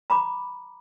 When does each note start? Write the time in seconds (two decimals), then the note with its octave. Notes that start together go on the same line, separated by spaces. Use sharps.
0.10 A#5 B5 D6